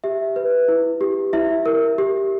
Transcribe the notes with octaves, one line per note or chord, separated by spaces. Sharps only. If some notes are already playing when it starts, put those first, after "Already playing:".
G4 E5
B4
E4
G4
E4 E5
A#4
G4